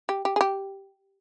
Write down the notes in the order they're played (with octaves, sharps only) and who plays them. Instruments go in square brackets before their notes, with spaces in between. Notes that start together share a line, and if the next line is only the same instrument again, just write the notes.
[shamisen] G4
G4
G#4
G4